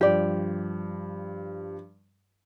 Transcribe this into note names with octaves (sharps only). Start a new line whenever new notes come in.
G2 F3 G4 D5